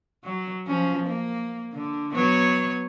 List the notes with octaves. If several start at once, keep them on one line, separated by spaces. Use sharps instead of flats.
F#3
F3 C#4
A#3
D3
F#3 B3 C#5